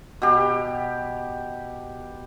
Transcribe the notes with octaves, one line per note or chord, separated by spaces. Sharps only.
B2 G4